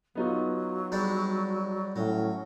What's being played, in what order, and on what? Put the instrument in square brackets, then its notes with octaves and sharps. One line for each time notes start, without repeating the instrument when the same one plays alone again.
[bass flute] F#3 [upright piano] B3 D#4 F4
[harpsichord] G3 G#3 D4
[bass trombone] A2 [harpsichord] F#3 [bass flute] C#4